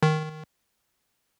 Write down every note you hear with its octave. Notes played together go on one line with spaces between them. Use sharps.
D#3